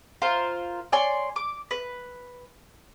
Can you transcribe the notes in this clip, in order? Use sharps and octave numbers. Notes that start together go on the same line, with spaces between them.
F4 A#4 C5
C#5 D5 G#5 C6
D6
B4